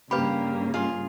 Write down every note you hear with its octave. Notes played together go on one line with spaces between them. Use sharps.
G2 C#3 A#3 G4 B4 F5 B5
F4 G#4 F5